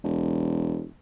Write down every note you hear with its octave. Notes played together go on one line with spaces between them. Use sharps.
E1